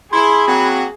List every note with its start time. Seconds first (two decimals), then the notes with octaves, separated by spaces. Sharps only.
0.13 E4 G#4 B5 C6
0.48 F#3 A#3 C4 F#4